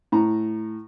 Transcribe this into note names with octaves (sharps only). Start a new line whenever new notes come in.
A2 A#5